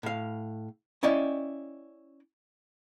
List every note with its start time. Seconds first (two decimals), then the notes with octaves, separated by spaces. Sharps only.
0.03 A2 F5
1.03 C#4 E4 D5 D#5 G5